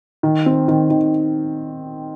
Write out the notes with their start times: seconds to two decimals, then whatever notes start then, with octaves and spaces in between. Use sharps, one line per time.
0.23 D#3
0.46 C4
0.68 D#3
0.90 D#3